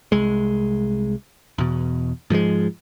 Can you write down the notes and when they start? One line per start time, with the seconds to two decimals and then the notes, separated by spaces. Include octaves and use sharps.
0.12 C2 G#3
1.58 E2 B2
2.30 G#2 F3 F#3 G#3